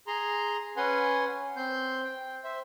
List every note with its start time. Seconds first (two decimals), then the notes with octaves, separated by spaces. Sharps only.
0.07 G#4 A#5 C6
0.77 C#4 B4 F#5 G#5 C6
1.56 C4 C6 G6
2.04 G5
2.44 C5 E5